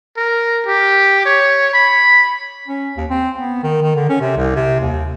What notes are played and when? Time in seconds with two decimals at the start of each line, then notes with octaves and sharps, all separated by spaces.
0.17 A#4
0.66 G4
1.26 C#5
1.74 B5
2.68 C#4
2.97 D#2
3.10 C4
3.38 B3
3.63 D#3
3.82 D#3
3.96 D3
4.09 C#4
4.21 C3
4.37 C2
4.56 C3
4.80 D#2